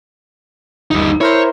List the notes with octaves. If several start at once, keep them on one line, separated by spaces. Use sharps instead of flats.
G1 D#2 G3 D#4
E4 A#4 C5 C#5